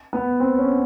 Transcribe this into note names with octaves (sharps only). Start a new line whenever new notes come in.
B3
C4
C#4